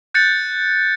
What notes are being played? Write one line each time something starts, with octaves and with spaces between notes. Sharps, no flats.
F#6 G6 A6 C#7